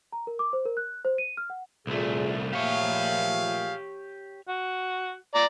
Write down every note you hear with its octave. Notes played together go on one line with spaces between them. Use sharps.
A#5
A#4
D6
C5
A#4
F#6
C5
D#7
F6
F#5
C2 A#2 A3 G#4
A#2 F3 A3 G4 G#4 C#5 F5
F#4
D5 A#5